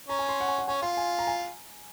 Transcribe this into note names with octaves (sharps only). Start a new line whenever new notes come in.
C#4 A#5
G#5
C6
F#5
G#5
F#5
C#4 G#5
F4 C6
G#5
A#5
G#5